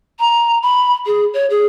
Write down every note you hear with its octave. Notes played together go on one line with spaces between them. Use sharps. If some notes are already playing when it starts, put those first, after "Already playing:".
A#5
B5
G#4
C#5
G#4